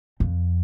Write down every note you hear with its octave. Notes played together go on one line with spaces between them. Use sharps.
F2